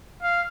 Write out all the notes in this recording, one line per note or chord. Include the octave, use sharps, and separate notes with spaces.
F5